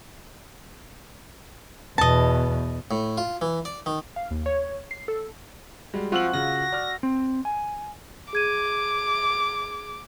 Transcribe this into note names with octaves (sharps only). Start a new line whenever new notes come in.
E2 B2 D#5 A5
A2
F4
E3
D5
D#3
F5
D#2
C#5
C7
A4
G3 G#3 F#4
F3 C4 F#4 E6 F#7
C#3 F4 A#6
D5 F6
C4
G#5
G#4 D6 G#6 D#7